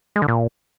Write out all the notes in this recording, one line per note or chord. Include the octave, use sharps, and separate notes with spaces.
G#3
D3
A#2